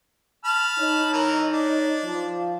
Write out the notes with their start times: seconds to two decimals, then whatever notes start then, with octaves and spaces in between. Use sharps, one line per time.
0.45 A5 B5 F6
0.79 D#4 C#5
1.13 E3 A#4
1.53 D4
2.04 F3